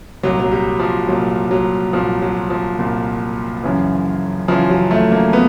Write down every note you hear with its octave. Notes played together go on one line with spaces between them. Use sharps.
C2 A#2 F#3
F#3
G3
F3
C2 A#2 F#3
F#3
C2 A#2 F3
F#3
F3
C2 A#2
F#2 C#3 E3
F#2 C#3 E3 F3
F#3
A3
A#3
B3